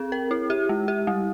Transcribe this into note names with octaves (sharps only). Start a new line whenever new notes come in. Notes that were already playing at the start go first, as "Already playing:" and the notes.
Already playing: C4 G#4
A#4
E4
G4
G#3
G4
G3